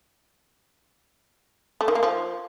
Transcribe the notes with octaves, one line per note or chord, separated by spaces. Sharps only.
A3
D#3
A#3
F3